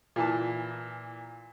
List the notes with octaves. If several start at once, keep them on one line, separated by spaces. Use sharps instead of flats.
A#2 E3 A5